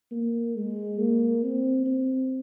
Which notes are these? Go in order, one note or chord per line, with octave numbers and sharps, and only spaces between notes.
A#3
G#3
A#3
C4
C4